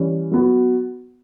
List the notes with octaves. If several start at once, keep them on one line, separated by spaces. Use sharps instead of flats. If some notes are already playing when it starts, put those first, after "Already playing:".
Already playing: E3 G3 C#4
F#3 B3 F#4